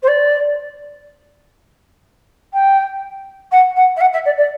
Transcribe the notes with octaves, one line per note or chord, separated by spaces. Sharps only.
C5
D5
G5
F#5
F#5
E5
F#5
E5
D5
D5